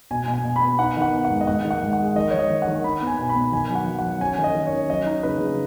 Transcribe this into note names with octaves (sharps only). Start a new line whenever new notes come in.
B2 G#5
B2
G#5
B2
B5
B3
D#4 F#5
D#3
F#5
B3
F#5
G#2
D#5
G#2 F#5
D#3
F#5
G#2
F#5
G#3
D#3 D#5
D#3 C#5
D#5
D#3
F#5
D#3
D#4 B5
B3
G#5
B2
B5
B3
D#3 G#5
F#3
F#5
F#3
F#5
F#3
C#4 G#5
D#3
D#5
D#3
C#5
C#4
F#3 D#5
D#4
C#3 B4
C#3